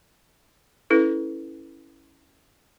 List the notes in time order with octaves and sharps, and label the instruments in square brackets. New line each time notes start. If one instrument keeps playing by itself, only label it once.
[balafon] C#4 E4 A4 B4